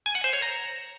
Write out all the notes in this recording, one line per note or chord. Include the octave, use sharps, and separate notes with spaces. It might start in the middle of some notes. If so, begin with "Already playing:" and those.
G#5
F#5
C5
C#5
A#5